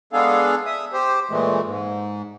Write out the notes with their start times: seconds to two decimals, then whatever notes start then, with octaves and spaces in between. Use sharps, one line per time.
0.13 G#3 B3 D4 G#4 A4 F5
0.66 E5 D#6
0.93 G4 C5
1.30 A#2 E3 G#3 A3
1.65 G#2